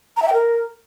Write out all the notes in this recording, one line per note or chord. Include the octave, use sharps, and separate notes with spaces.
A#5
E5
G5
A#4